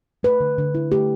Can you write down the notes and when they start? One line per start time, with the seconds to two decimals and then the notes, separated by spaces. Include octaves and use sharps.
0.23 A3 B4
0.40 D3
0.58 D3
0.75 E4
0.92 A3 G4